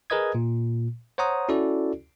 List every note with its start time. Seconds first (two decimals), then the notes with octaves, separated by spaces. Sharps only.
0.10 G#4 A#4 B4 D#5 D#6 G#6
0.35 A#2
1.18 C5 C#5 F#5 A#5 D#6
1.49 C#4 E4 F#4 A4 D5